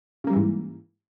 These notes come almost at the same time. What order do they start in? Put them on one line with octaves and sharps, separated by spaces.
C#3 A#3 G3 E3 G#2